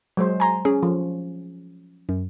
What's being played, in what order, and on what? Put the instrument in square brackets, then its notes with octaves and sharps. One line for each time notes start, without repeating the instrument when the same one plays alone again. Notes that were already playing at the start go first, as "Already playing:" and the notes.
[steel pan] F#3 G#3 C5
[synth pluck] G#5 A#5 C6
[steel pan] C#4 [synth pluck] G#4
[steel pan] F3
[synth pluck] F#2